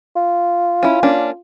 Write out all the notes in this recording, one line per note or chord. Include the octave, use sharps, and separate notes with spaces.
F4
C#4 E4
A#3 C#4 D4